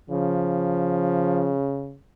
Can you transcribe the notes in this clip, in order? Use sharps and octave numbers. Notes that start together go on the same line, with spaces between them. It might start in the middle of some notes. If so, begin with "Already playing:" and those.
C#3 F3